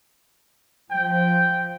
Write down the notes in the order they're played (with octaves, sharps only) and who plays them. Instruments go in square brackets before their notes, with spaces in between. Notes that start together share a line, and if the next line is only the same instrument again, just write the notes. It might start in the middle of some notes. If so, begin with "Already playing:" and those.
[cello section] F3 [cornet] G5